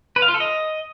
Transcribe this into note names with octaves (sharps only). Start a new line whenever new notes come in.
B4
F5
F4
A4
D#5